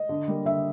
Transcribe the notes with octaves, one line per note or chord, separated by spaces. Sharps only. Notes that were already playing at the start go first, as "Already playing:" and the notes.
Already playing: D#5
D3
G3 A#3
D3 E5